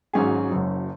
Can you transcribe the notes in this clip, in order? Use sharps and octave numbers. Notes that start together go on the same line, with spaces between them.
G#1 G#2 F#3 C#4 G#4
F#1 F#2 F#3